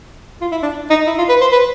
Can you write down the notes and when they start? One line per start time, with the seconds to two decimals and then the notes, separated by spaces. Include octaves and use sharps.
0.41 F4
0.51 E4
0.62 D4
0.90 D#4
1.07 E4
1.18 F4
1.29 B4
1.41 C5
1.52 B4